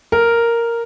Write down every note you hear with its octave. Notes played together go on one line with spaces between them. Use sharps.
A#4